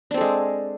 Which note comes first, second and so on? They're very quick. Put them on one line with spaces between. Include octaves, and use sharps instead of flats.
D4 C4 A4 G#3